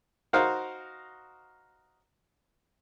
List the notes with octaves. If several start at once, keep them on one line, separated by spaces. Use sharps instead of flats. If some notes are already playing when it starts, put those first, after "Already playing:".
D#4 F#4 A#4 C5 F5